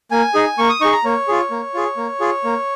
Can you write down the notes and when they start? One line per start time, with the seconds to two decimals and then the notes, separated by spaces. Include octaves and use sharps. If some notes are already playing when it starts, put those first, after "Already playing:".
0.11 A#3 G#5
0.34 D#4 G#4
0.58 A#3 C#6
0.69 D#6
0.81 D#4 G#4 C#6
0.92 A#5
1.04 A#3 C#5
1.28 F4 G#4
1.51 A#3
1.74 F4 G#4
1.97 A#3
2.20 F4 G#4
2.44 A#3